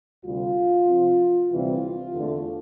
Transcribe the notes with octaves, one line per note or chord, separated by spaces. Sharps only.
D2 C3 G3 F4
C3 F3 C4
D2 C3 E3 G3 C4 F4
E2 D3 A3